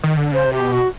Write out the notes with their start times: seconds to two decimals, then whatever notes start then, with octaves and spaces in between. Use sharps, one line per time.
0.04 D#3
0.17 D3
0.32 C#3 C5
0.46 C3
0.52 G4
0.60 B2
0.72 F#4